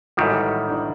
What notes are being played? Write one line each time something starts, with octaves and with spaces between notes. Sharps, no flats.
A1 G#2 D#3 G3 E4 F#4
D4 E4